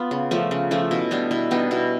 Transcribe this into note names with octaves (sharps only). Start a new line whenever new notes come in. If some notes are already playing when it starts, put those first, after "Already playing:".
Already playing: B3 F4
C#3
F3 A3 C#4
C#3
F3 A3 C#4
B2 E4
G3 B3 D4
B2 E4
G3 B3 D4 D#4
B2 E4